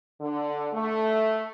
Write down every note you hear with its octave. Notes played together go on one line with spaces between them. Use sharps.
D3
A3